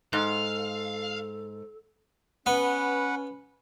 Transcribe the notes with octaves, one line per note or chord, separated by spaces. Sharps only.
G#2 A4 F5
B3 C#4 B4 F#5